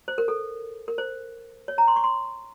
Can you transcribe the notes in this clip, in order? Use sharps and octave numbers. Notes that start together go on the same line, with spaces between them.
C5
A#4
A4
A#4
C5
C#5
A#5
C6
C#6
C6